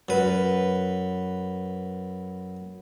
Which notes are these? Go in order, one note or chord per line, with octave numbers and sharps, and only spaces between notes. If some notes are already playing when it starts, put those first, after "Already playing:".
F#2 B4